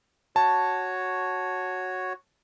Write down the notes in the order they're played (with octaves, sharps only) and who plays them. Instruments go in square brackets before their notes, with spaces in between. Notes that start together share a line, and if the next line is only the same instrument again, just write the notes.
[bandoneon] F#4 C#5 [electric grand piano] A5